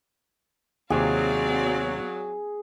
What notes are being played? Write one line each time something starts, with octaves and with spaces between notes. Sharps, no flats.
D#2 C3 F#3 C4 G#4 D5 F5